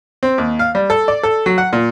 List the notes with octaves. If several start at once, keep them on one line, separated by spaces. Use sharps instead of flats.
C4
D#2
F5
G3
A4
D5
A4
F#3
F#5
A#2